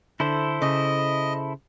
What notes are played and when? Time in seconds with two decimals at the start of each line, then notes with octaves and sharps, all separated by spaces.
0.20 D3 E4 A4 C5
0.62 C#3 D#5